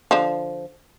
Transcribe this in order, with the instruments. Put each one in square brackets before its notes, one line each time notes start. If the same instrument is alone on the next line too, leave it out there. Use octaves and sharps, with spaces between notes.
[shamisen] D3 F3